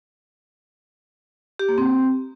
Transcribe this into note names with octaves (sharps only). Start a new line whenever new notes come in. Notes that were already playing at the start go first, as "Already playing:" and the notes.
G4
A#3
C4